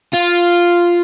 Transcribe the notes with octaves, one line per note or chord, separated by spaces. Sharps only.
F4